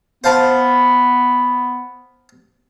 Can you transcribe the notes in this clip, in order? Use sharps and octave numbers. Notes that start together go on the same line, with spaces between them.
B3 C5 F5 A5